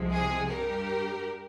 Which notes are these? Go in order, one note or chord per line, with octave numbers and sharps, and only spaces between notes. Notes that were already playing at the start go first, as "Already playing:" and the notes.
Already playing: C2 C3 F3 G#3
G#4
G2 G3 G4 A#4